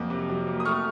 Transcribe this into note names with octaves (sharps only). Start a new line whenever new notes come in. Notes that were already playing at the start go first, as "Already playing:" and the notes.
Already playing: F2 F#3 A#3
C3
F#3
A#3
D#6
A3 C#6 F6